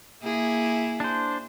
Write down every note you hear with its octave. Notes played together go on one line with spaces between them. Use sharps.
A#3 E4 G#4
D4 C5